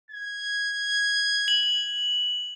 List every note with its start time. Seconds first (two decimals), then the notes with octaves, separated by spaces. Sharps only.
0.11 G#6
1.48 F#7